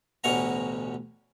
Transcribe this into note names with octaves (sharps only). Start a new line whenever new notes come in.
A1 D2 B2 C#4 F#5 A#5